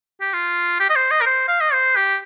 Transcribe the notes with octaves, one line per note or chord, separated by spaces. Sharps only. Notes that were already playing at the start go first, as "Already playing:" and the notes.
G4
F4
G4
D#5
C5
D#5
A#4
C5
F5
D#5
C5
G4